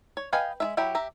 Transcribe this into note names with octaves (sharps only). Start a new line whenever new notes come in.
C#5
B4 D#5 F5 G5 G#5
G#3 F4 E5
F#3 E4 G4 E5 G5
G4 E5 A#5